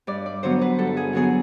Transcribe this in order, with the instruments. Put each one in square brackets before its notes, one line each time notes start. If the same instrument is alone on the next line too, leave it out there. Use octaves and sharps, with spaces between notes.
[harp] G2 D5
D5
D3 F#3 B3 C5
B4
G2 A4
G#4
D3 F#3 B3 G#4